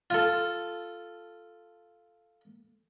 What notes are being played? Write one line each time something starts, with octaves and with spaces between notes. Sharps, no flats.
F4 A4